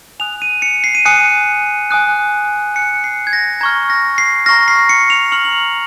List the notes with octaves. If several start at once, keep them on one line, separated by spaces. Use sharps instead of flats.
G#5 D#6 F#6 F7
D#7
C#7
C7
D#7
G#5 D#6 F#6 C#7
G#5 D#6 F#6
G#5 D#6 F#6 C#7
C7
G#6
A#6
A#5 C#6 F6 G#6
A#6
C7
A#5 C#6 F6 A#6
C7
C#7
F7
A#5 C#6 F6 F#7
F#7
F7